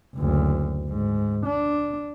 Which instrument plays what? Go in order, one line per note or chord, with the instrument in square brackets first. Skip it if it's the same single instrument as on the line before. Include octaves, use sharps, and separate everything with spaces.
[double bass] F#1 D2
G#2
D4